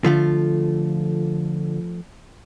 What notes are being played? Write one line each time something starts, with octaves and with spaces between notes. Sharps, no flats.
D3 F3 A3 F4